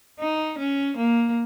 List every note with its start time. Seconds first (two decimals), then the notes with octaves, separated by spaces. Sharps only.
0.20 D#4
0.58 C#4
0.97 A#3